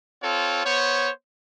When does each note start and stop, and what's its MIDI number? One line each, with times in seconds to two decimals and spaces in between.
0.23 0.61 60
0.23 0.61 65
0.23 0.61 69
0.23 0.61 73
0.65 1.10 59
0.65 1.10 72
0.65 1.10 73